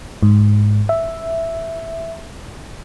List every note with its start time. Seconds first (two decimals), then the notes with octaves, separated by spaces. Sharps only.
0.23 G#2
0.89 E5